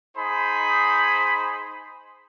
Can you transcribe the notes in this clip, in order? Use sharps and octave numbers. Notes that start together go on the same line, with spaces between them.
D#4 G#4 C5 B5